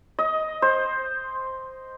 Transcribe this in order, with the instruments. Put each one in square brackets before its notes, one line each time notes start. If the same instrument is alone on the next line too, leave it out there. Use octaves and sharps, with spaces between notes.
[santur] D#5
C5